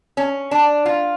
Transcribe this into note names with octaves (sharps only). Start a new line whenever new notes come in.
C#4
D4
F4